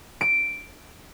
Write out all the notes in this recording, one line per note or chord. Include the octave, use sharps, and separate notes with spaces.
D7